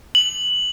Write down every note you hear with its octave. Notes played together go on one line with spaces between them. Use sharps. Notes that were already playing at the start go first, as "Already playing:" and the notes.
F#7